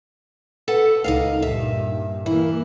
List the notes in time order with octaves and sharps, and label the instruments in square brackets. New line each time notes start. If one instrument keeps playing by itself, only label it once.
[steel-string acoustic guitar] A4 B4 F#5
[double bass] C#2 [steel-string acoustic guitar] D#4 A#4 F5
[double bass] G2 A#2 [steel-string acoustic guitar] E5
[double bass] E3 A#3 [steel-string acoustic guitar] E4